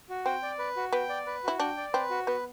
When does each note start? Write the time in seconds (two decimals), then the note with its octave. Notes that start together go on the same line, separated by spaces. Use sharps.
0.09 F#4
0.26 C4 G5
0.42 D5
0.59 B4
0.77 F#4
0.93 B3 G5
1.09 D5
1.26 B4
1.44 E4 F#4
1.60 D4 G5
1.77 D5
1.94 C4 B4
2.10 F#4
2.27 B3 B4